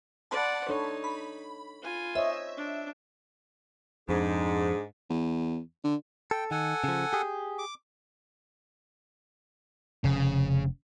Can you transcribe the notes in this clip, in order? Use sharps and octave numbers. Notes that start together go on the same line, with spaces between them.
D5 F#5 A5 B5 C6
D4 D#4 A4 C#5
B5
F4 G#5
C5 C#5 D#5 E5
D4
F2 G#2 D4 G#4
E2
D3
A4 G5
D#3 A4 F#5 G#5
C#3 F3
G4 G#4
D6
F1 C#3